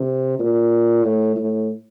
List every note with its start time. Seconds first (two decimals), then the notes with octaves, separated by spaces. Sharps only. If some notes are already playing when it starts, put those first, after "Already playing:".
Already playing: C3
0.39 A#2
1.04 A2
1.36 A2